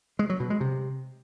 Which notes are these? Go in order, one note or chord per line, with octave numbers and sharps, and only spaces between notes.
G#3
F#3
B2
G#3
C3